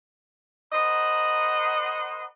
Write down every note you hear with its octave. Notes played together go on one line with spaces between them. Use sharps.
A#4 C5 D#5 F#5 A#5 B5